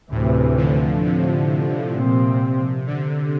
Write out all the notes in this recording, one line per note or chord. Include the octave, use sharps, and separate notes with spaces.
D2 A2 C3 E3
D3 F3
C3
A#2 F3 C4
D3